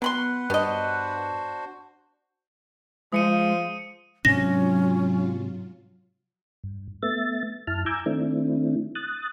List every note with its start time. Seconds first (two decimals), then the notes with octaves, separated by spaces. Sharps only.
0.02 F#3 B3 B4 F#5 B5 C6
0.50 G2 B3 D4 F#4 C5 D#5
3.13 F3 G#3 D#6 C#7 D#7
4.25 G#2 C3 F#3 C#4 D4 F4 A#6
6.64 G2
7.03 A3 B3 E5 A6
7.67 F#2 E4 A5 F6
7.86 G#5 A#5 D6 E6 G6 G#6
8.06 D#3 A3 C4 D4 E4
8.95 D#6 F#6 A6